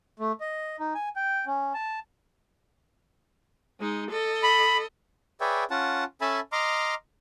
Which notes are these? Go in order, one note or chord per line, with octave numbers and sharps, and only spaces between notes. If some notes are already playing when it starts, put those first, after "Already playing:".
A3
D#5
D#4
G#5
G5
C#4
A5
G#3 D#4
A4 D#5
B5
G#4 B4 C#5 D5 E5 G5
C#4 F4 F#5 A5
C#4 A4 E5 G#5 A5 B5
D#5 A#5 C6 D6 F6